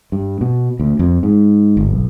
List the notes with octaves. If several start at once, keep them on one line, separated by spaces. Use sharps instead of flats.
G2
B2
D2
F2
G#2
G1
B1